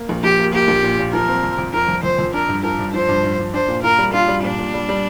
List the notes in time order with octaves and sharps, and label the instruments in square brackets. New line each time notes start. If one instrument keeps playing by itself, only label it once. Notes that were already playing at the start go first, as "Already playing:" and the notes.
Already playing: [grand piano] A#3
A#1
[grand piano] A#1 [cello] G4
[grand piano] A#3
[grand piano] A#3 [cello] G4
[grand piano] A#1
A#2
A#2
[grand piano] F3 [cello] A#4
[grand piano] C4
F2
F2
[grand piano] F3 [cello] A#4
[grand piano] F2
[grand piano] F2 [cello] C5
[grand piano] F2
[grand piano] D4 [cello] A#4
[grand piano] G2
[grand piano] F3 [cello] A#4
[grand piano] G2
[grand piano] F3 [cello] C5
[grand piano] G2
G2
G2
[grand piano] D4 [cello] C5
[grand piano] A#2
[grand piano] F4 [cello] A#4
[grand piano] G3
[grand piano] D4 [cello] F4
[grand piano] G3
[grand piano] A#2 [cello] D4
[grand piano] A#2
G3
G3